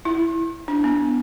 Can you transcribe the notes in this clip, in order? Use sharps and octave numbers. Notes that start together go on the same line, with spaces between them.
E4
D4
B3